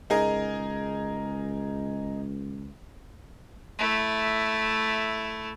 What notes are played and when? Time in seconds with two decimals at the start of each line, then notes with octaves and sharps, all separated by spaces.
0.10 C#2 D#4 G#4 A#4
3.79 A3 E4